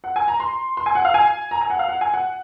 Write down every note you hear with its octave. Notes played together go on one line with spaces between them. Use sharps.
F#5
G#5
A#5
C6
C6
G#5
F#5
F5
G#5
A#5
G#5
F#5
F5
F#5
G#5
F#5